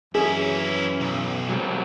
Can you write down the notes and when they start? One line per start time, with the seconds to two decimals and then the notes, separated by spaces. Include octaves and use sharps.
0.15 F#2 E3 F#3 C#4 E4 G#4
1.00 B1
1.49 F#3 G3 C4